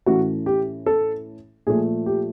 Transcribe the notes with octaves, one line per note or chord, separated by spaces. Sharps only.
A2 E3 A3 C#4 F#4
G4
A4
A#2 F3 A3 G#4
G4